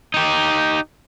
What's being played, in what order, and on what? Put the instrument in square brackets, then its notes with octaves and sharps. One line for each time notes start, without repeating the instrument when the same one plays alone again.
[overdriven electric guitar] D#4 G4